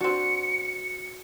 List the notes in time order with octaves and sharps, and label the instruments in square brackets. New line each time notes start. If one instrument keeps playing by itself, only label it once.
[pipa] C4 D4 [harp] F#4 [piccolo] C#7